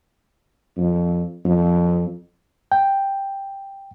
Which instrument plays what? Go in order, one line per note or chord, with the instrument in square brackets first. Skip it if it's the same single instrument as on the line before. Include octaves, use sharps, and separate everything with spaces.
[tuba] F2
F2
[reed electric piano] G5